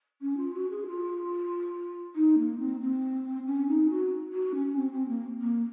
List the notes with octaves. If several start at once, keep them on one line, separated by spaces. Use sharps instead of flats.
C#4
F4
F#4
G#4
F4
D#4
A#3
C4
C4
C#4
D#4
F#4
F#4
C#4
C4
C4
A#3
A#3